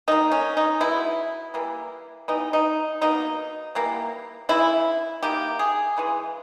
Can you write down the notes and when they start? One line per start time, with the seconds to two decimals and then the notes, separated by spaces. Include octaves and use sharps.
0.08 D#3 A#3 D#4
0.32 C#4
0.57 D#4
0.80 B2 G#3 B3 E4
1.54 E3 G3 A#3
2.28 E3 G3 B3 D#4
2.53 D#4
3.01 B2 A#3 D#4
3.75 E3 G3 A#3
4.49 C#3 E3 G#3 E4
5.23 D#3 A#3 G4
5.59 G#4
5.97 C#3 E3 G#3